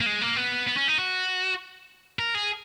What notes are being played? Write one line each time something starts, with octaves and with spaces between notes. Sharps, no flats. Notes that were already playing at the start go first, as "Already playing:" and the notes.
A#3
G#3
A#3
B3
B3
C#4
D#4
F#4
A#4
G#4